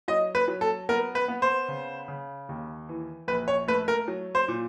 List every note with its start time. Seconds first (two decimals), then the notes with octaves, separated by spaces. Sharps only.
0.08 F#3 D#5
0.35 B4
0.48 F#3
0.61 A4
0.89 B3 A#4
1.15 B4
1.28 B3
1.42 C5
1.68 C#3
2.08 C#3
2.49 D#2
2.89 E3
3.28 A#1 B4
3.48 C#5
3.68 A3 B4
3.88 A#4
4.08 F#3
4.35 C5
4.48 A#2